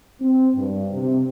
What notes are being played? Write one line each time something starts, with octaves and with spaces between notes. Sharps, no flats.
C4
G2
C3